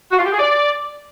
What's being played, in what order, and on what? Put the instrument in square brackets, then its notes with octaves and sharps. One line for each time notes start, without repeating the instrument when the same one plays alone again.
[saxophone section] F#4
F4
G4
G#4
D5